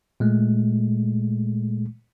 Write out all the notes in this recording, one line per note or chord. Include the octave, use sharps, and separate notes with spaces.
A#2 G#3 A3